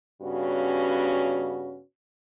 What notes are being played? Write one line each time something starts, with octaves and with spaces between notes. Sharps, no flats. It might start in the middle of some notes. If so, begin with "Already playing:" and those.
G2 C#3 B3 C#4 F#4